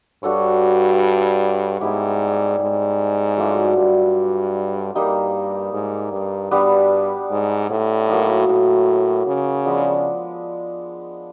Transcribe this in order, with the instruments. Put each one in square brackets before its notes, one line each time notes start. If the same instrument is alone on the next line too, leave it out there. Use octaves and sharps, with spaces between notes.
[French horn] G2 [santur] D4 F#4 A4 C#5
[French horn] G#2 [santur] G3 B3 E4 G4
[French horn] G#2
[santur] F#3 A3 D4 F4
[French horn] G2
[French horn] G2 [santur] G3 A#3 D#4 G4
[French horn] G#2
G2
[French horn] G2 [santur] G3 B3 D4 G4
[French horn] G#2
A2
[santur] F#3 A#3 D#4
[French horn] A2
C#3
[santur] F3 G#3 B3 D4